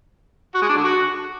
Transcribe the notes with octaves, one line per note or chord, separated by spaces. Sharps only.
F#4
G#3
D4
D3
F#4